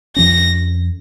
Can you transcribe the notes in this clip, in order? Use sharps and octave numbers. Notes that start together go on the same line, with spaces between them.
F2 F3 C#4 A#6